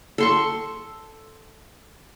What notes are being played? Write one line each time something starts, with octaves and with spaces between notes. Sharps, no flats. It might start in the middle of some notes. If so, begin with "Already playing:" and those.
A4 C6 C#6